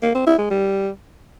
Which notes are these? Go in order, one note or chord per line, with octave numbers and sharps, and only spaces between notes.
A#3
C4
E4
G#3
G3